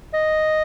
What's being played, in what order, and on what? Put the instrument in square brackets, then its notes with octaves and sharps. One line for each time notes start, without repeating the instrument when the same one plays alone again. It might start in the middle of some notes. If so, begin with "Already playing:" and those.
[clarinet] D#5